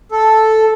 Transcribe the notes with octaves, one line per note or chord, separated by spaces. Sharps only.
A4